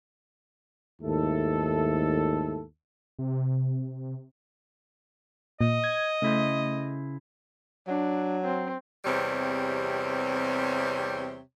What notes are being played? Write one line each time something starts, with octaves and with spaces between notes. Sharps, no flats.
D#2 G#2 A3 E4 A4
C3
A#2 D#5
G#6
C#3 A3 E4 C5
F#3 D4
C4
E2 C3 G3 C4 C#5